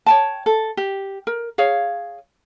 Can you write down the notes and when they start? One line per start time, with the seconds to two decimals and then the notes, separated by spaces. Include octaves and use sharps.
0.06 C#5 G5 A5
0.46 A4
0.77 G4
1.27 A#4
1.58 G#4 C#5 F5